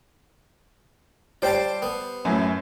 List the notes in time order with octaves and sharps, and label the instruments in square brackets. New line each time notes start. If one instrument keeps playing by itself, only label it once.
[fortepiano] G3 C5 [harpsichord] D5 G5 A5
[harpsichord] B3
[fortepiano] F#2 A2